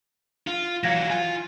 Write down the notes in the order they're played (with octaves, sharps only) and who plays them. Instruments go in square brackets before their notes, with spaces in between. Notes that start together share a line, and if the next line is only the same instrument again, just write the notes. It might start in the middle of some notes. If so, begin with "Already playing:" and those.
[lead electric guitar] F4
[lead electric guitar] E3 F#3 [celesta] F5 G#6 A#6
[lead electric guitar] F4 [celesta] G#5